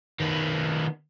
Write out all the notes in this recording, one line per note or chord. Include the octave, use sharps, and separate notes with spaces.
D#3 B3